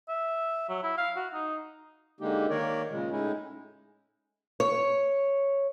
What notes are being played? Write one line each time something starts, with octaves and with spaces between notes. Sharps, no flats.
E5
F#3
E4
F5
F#4
D#4
D3 G#3 A#3 D#4 G4
D#3 A#3 A#4 C#5 D5
A#2 C#3 G#3
A2 G#3 C#4 D#4 E4
C#5